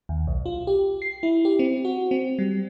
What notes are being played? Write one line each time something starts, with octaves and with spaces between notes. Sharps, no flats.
D#2
B1
F4
G4
C7
E4
G4
C4
F#4
C4
G3